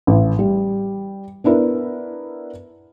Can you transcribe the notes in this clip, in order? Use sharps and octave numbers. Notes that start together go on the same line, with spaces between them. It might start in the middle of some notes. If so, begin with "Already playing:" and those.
A1
G3
B3 D4 E4 A#4 B4